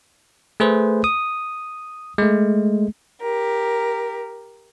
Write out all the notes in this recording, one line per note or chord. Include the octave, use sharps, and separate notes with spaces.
A3 G#4 B4 C5
D#6
G#3 A3
G4 A#4